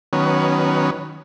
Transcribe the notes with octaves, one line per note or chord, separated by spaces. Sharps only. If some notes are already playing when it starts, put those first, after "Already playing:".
D#3 F#3 B3 C#4